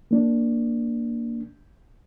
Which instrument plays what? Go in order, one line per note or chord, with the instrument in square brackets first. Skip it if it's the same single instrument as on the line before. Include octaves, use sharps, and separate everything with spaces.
[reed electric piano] A#3 D4